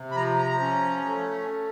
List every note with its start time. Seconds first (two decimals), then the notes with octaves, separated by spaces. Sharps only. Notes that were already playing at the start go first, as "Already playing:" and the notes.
Already playing: C3
0.11 B5
0.15 F3 A#5
0.38 A#5
0.60 C#4
1.05 A3